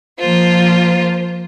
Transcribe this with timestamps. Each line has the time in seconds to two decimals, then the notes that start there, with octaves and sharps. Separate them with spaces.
0.19 F3 A#3 F4 C5